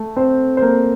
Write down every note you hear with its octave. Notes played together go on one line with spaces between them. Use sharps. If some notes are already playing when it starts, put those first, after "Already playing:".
Already playing: A3 A4
C4 C5
C5
A#3 A#4